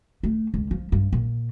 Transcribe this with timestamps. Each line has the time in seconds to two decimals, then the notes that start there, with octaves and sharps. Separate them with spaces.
0.23 A3
0.54 C#2
0.71 F3
0.92 G2
1.12 A#2